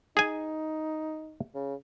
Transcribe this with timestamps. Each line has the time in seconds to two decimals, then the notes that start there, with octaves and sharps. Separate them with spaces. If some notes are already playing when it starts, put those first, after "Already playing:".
0.17 D#4 G#4 G#5
1.55 C#3